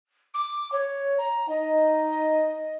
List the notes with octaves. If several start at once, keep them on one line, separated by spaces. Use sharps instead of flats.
D6
C#5
A#5
D#4 D#5